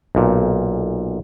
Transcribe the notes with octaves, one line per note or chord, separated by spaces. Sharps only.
B1 A#2